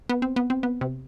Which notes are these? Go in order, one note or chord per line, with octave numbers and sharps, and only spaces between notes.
B3
C4
B3
C4
B3
C3